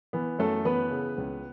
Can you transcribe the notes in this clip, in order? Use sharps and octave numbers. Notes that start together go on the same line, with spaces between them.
E3 B3
F#2 A3 A4
E3 B3 B4
C#3
C#2